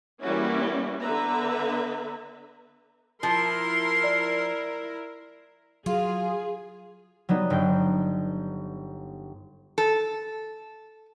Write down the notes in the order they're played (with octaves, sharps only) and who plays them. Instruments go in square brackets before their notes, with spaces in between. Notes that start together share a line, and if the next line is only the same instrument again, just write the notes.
[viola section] E3 G3 A#3 C#4 E4 F#4
D3 B3 B4 E5 A#5
[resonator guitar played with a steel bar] F3 [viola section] E4 A#4 [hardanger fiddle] C6
[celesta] D5
[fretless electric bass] F#3 [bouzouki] F4 [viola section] G#4
[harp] F#3 G3 B3 D#4
G1 G5
[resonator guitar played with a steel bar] A4